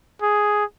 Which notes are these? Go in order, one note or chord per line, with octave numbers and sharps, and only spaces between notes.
G#4